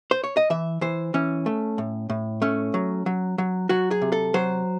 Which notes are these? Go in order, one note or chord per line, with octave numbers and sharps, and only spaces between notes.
C5
C#5
D#5
E3 E5
E3 C5
E3 C#4
A3
A2
A2
A3 C#4
F#3
F#3
F#3
F#3 F#4
G#4
C3
A4
F#3 C5